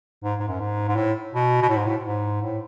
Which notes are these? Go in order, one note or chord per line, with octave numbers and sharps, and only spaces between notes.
G#2
G#2
F#2
G#2
G#2
A2
B2
B2
A2
G#2
A2
G#2
A2